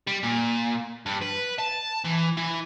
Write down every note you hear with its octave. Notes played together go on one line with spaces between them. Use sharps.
G3
A#2
G2
B4
A5
E3
E3